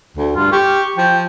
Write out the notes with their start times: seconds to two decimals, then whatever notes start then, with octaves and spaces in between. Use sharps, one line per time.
0.17 D2
0.36 G2 F4
0.52 G4 C#6
0.97 F3 G5